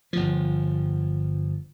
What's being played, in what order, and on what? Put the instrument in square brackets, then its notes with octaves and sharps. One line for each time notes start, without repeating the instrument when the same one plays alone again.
[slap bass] G1 F3